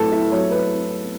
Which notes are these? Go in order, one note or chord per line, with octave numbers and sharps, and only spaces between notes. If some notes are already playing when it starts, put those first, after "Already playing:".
Already playing: F#3 A3 E4 A4 A5
E4 E5
F#3 C#5
B4